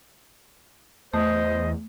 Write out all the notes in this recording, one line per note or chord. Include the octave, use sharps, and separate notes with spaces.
E2 A3 C5 D#5